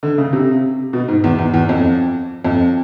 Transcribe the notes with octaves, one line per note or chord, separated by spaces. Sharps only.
D3
C#3
C3
B2
G#2
E2
E2
E2
F2
F2